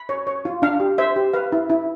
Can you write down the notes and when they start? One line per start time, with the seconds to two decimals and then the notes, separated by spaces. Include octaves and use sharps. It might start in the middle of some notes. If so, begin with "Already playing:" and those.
Already playing: B5
0.09 C#5
0.27 C#5
0.45 F4
0.62 D4 F5
0.80 G4
0.98 C5 E5
1.16 G4
1.33 B4 F5
1.52 E4
1.70 E4